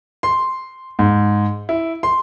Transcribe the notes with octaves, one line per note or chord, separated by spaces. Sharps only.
C6
G#2
E4
C6